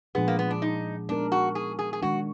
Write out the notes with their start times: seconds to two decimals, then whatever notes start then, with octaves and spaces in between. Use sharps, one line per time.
0.15 A#2 F3 G#3 B3 D4 G#4
0.28 A#3
0.39 B3
0.50 D4
0.62 D#4
1.09 G#3 B3 D4 D#4 A#4
1.32 F#4
1.55 G#4
1.79 G#4
1.93 G#4
2.02 D#3 G#3 D4 F#4